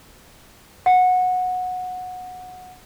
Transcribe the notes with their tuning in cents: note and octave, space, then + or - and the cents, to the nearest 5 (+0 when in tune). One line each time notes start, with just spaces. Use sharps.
F#5 -15